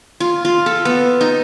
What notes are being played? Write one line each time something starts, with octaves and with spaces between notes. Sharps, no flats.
F4
F4
A4
B3
D#4